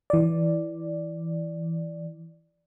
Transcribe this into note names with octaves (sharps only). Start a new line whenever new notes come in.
E3 D5